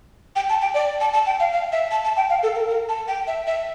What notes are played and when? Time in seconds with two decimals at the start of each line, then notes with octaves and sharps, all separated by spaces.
0.36 G5
0.49 A5
0.62 G5
0.74 D5
1.00 A5
1.13 A5
1.26 G5
1.40 F5
1.52 F5
1.72 E5
1.91 A5
2.04 A5
2.17 G5
2.30 F5
2.43 A4
2.55 A#4
2.68 A#4
2.89 A5
3.08 G5
3.27 E5
3.47 E5